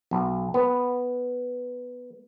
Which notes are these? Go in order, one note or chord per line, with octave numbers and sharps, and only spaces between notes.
B1
B3